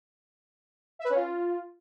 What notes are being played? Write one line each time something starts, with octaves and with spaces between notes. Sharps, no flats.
E5
B4
C#4
F4